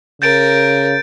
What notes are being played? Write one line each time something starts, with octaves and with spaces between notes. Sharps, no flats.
C#3 A#4 G6 A6 D7